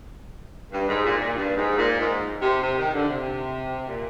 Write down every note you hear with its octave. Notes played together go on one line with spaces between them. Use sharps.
G2
G#2
A#2
A#2
G2
G#2
A#2
G#2
C3
C3
D#3
D3
C3
A#2